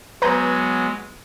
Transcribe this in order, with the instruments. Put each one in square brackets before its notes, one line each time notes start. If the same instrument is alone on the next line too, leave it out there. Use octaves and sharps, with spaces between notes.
[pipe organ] F#3 G#3 B3 [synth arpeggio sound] B4 A#5 G6